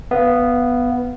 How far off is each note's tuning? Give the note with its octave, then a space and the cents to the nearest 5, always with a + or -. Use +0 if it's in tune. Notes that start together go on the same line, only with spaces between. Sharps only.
B3 +0 F5 -20